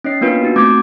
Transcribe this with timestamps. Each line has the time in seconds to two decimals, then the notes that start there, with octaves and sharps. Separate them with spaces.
0.04 C#4 D#4 C#5 D#5 C7
0.21 A#3 B3 D4 F4 B4
0.42 D#4 F#4
0.56 A3 C4 D6 G6 G#6